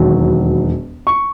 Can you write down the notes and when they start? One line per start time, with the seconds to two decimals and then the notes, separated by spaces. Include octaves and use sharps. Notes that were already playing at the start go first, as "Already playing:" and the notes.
Already playing: E1 D#2 D#3 F#3
1.07 C#6